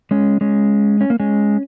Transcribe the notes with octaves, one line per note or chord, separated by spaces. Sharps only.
G#3 C#4
G#3 C#4
C#4
A#3
G#3 C#4